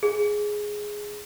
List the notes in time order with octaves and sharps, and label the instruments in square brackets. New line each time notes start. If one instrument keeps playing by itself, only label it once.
[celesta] G#4